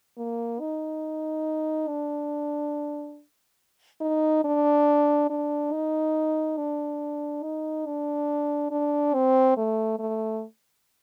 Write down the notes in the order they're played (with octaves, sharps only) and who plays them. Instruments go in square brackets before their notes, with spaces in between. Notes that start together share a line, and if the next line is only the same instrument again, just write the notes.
[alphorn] A#3
D#4
D4
D#4
D4
D4
D#4
D4
D#4
D4
D4
C4
A3
A3